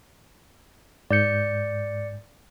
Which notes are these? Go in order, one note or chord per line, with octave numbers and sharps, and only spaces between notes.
G#2 D5 G6 C#7